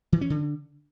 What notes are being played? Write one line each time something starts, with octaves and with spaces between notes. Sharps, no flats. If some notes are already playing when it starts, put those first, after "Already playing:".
E3
C#4
D3